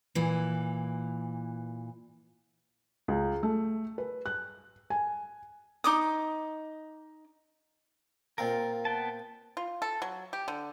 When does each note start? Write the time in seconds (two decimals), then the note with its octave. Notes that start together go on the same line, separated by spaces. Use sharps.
0.15 A#2 E3
3.08 C#2
3.43 A3
3.98 B4
4.26 F#6
4.90 G#5
5.84 D#4 D6 D#6
8.38 A#2 C4 F4 A#4 F5
8.85 B3 G5 A5
9.57 F4
9.82 A4
10.02 F#3
10.33 G4
10.48 D3